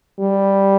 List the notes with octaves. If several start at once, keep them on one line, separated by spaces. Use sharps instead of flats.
G3